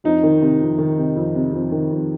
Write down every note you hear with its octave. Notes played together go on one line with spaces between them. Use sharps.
F2 D#4
D#3
C3
F2
D#3
C3
F2
C3
F2
D#3
F2